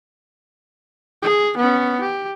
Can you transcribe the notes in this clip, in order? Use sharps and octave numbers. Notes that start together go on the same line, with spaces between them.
G#4
B3 C#4
G4